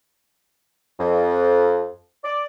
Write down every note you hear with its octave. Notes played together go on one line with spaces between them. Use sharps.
F2
D5